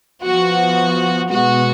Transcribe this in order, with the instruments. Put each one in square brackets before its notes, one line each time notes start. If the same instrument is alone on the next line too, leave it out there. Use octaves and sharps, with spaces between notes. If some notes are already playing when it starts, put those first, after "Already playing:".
[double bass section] F3 B3 [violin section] F#4
[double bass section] B2 G#3 B3 [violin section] F#4